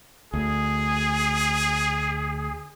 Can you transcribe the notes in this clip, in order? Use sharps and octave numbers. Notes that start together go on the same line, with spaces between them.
D2 G#4